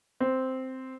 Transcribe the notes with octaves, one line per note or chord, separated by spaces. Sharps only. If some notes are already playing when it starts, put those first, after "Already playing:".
C4